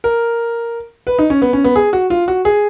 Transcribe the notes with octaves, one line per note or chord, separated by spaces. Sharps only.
A#4
B4
D#4
C#4
B3
C#4
B3
G#4
F#4
F4
F#4
G#4